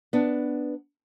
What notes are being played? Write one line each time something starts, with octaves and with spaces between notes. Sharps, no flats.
B3 D4